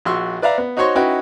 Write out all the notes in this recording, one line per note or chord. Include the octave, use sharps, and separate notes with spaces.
A#1 F#4 C6 C#6 E6
B4 D5 E5 F5 A#5
B3
D#4 F#4 C5 C#5 C6 C#6
C#4 D#4 E4 F#4 B4 G5